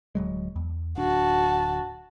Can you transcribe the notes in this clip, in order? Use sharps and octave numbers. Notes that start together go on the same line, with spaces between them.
D1 F#3 G#3
E2
D1 D4 F#4 A5